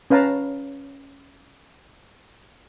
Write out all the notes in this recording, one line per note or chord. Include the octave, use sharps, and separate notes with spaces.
C#4 B4 F5 A5 A#5